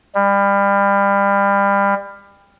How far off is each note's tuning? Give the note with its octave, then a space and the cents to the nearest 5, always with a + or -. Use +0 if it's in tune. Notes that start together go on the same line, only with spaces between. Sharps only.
G3 +30